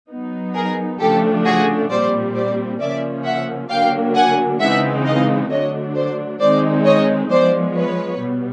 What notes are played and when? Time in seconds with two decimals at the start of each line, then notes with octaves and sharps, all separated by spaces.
0.10 F#3 B3 D#4
0.55 G#4 A#4
1.00 C#3 F3 A3 D4 G4 A4
1.45 F#4 G#4
1.90 A#2 G3 C4 C5 D5
2.35 C5 D5
2.80 C#3 F3 A#3 C#4 D5 E5
3.25 E5 F#5
3.69 D3 F#3 A#3 D4 F5 G5
4.15 F#5 G#5
4.60 C#3 E3 G#3 C4 D#4 E5 F#5
5.05 D#5 F5
5.50 D3 F#3 A3 D4 C#5 D#5
5.95 C5 D5
6.40 D#3 G#3 C4 D#4 C5 D5
6.85 C#5 D#5
7.30 F3 G#3 B3 C5 D5
7.75 B4 C#5
8.20 B2 G3 B3